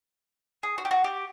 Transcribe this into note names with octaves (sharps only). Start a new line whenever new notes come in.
G#4
F#4
G4
F#4
G4